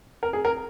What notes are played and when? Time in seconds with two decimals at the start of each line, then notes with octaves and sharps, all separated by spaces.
0.23 A#4
0.33 G#4
0.45 A#4